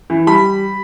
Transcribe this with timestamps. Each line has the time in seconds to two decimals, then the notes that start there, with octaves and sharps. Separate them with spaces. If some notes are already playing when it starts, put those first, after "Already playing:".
0.10 E3
0.27 G3 B5